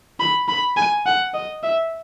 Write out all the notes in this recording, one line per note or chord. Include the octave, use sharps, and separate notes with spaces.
B5
B5
G#5
F#5
D#5
E5